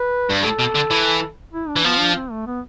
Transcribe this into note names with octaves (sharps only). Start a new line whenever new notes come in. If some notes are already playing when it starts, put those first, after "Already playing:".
Already playing: B4
G2
A2 A4
B2
D3
E3
E4
D4
E3
F3 B3
D4
C4
A3
B3